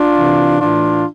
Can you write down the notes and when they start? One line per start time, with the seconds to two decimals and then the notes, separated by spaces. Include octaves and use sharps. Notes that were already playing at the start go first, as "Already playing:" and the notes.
Already playing: D4 F4
0.17 C3 E3
0.60 A2 E3 D4 F4